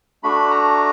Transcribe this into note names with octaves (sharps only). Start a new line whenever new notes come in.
A3 D4 F#4 B5
A#5